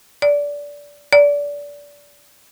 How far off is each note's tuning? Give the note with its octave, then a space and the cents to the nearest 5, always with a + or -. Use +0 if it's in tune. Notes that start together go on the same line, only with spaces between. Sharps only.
D5 -20
D5 -25